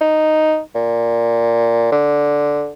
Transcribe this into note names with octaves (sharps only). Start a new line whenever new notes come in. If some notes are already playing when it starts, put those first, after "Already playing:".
D#4
A#2
D3